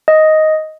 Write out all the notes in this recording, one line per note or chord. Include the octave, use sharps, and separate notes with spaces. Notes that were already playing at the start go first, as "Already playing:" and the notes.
D#5